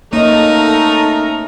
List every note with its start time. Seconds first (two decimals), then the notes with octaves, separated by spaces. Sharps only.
0.13 A3 A#3 C#4 D#4 A4 A#4 D#5